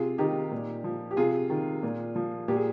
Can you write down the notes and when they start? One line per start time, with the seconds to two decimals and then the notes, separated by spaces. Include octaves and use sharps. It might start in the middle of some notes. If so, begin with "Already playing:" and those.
Already playing: C3 F4 G#4
0.18 D#3 D#4 G4
0.51 A#2
0.84 F3
1.11 G4
1.17 C3 F4 G#4
1.50 D#3
1.83 A#2
2.15 F3
2.48 A#2 G4
2.56 G#4